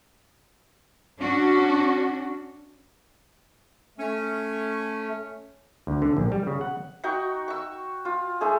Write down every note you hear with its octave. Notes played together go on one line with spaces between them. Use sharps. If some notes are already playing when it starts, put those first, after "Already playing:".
C#4 D4 F#4
A3 C#4
D2
D3
A#1
G3
C#3
F#5
D#4 F#4 G5 C#6
C#6 E6
F4
G#3 A3 D#4 G#4